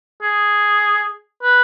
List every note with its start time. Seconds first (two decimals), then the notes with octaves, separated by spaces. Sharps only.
0.23 G#4
1.43 B4